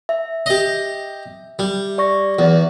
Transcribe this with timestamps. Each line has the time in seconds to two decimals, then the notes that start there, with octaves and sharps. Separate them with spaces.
0.09 E5
0.46 G4 D#5
1.59 G3
1.98 D5 C#6 A#6
2.39 E2